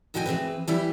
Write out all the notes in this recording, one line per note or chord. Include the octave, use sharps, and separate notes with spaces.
D#2 A#2 F#4 D#5 G5 G#5
E3 C4 G#4 B4
E3 G3 E4